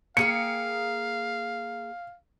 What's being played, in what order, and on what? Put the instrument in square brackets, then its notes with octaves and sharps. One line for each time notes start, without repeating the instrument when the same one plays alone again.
[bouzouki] A#3 G#4 G5 [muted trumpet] F5 [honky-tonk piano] C#7